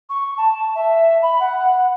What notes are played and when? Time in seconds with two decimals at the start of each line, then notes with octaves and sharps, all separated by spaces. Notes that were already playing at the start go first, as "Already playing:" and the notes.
0.09 C#6
0.37 A5
0.74 E5
1.22 B5
1.39 F#5